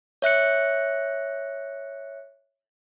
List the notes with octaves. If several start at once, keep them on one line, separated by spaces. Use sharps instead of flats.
C#5 E5 F#6 C#7